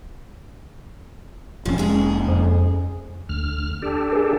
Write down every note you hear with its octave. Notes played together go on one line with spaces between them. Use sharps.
F1 G#2 F3 C#4
G#3 G#4
F2
D2 F6
D4 G4 A4
G#4 A#4